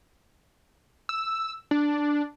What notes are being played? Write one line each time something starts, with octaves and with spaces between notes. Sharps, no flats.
E6
D4